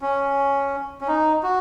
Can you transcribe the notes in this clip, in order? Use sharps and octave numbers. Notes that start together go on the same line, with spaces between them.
C#4
C#4
D#4
F#4